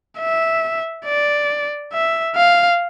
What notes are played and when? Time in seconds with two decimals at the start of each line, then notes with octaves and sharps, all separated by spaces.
0.19 E5
1.06 D5
1.93 E5
2.36 F5